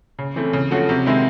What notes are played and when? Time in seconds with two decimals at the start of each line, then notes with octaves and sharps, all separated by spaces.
0.19 C#3
0.36 E3 A3 C4
0.53 C#3
0.71 F3 A3 C#4 F#4
0.89 C3
1.06 D#3 G#3 C4 E4